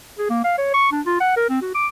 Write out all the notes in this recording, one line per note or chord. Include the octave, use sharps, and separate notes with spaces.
G#4
A#3
F5
C#5
C#6
D4
F4
F#5
A#4
C4
F#4
D6